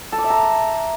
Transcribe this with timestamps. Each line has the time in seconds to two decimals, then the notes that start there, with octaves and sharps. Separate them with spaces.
0.12 A4
0.18 D6
0.24 E5
0.30 A#5